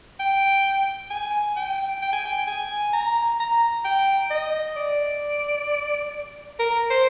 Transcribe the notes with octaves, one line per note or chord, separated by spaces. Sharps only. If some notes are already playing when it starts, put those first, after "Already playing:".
G5
G#5
G5
G5
G#5
G5
G#5
A#5
A#5
G5
D#5
D5
A#4
C5